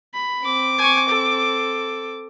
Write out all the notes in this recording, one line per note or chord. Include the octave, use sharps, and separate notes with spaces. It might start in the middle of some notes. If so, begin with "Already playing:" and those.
B5
C4 D6
G#5 C#6
A4